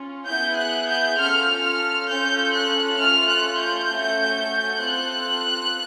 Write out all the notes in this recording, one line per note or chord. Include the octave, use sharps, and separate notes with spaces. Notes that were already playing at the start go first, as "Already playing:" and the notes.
Already playing: C#4 F4
B3 E4 G#4 G6
F#6
G6
C#4 F4 A4 F6
F6
C#4 F4 A4 G6
F#6
A3 C#4 F4 F6
F#6
G6
A3 C#4 F#4
C4 F4 A4 F#6